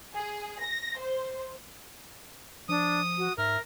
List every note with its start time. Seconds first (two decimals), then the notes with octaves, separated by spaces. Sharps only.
0.16 G#4
0.63 A#6
0.98 C5
2.69 F3 D4 D#6
3.18 F#4
3.38 G#2 A#4 E5